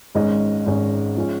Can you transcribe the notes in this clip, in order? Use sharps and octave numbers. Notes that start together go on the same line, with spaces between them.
G#1 G#2 G#3 C#4 D#5
G#1 G#2 G#3 C#4
F3 G#3 C#4